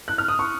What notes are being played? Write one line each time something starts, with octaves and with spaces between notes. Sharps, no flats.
F#6
F6
D#6
C#6